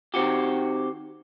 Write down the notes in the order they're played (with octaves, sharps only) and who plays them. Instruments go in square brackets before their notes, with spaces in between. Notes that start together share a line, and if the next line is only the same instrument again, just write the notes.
[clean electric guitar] D#3 C4 F#4 G4